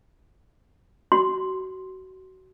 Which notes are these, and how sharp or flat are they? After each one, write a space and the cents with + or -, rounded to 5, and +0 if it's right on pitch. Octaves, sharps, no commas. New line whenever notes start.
F#4 +25 C6 +0